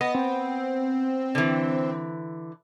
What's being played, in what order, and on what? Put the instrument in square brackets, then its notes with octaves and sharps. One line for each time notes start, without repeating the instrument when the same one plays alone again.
[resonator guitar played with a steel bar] B3 [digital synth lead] D#5
[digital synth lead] C4
[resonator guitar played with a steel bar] D3 E3